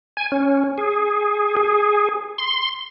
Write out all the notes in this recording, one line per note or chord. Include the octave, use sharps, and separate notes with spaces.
G#5
C#4
G#4
G#4
C6